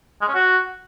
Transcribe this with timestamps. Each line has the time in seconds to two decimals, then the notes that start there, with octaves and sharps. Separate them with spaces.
0.21 G#3
0.28 C#4
0.34 F#4